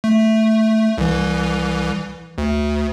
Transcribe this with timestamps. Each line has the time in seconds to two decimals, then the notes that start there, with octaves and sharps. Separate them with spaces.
0.04 A3
0.98 C2 E3
2.38 D2